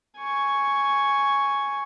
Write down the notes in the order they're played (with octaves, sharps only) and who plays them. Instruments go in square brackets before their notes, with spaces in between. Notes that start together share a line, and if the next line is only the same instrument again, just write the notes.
[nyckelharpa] G#5 C#6